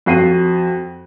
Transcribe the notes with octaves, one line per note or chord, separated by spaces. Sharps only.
F2 F#4 C7 D#7